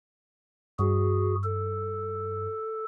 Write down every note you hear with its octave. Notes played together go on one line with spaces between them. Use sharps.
G2 F#4 G#4
A4